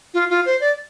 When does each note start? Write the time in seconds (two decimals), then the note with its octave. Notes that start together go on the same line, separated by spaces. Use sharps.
0.14 F4
0.30 F4
0.46 C5
0.61 D5